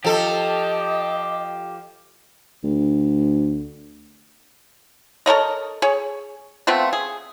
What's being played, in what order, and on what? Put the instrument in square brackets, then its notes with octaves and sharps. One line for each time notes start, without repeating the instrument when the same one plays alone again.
[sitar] F3 A4 [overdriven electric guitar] G4 [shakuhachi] D#5
[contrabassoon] D2
[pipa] A4 A#4 C#5 D#5
G#4 C#5
A3 B3 C4 F4
G#4